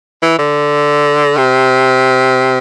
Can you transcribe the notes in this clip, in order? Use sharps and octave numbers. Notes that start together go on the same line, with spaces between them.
E3
D3
C3